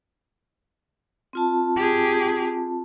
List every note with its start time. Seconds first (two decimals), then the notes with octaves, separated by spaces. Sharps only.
1.33 C4 F4 A5
1.76 G4 G#4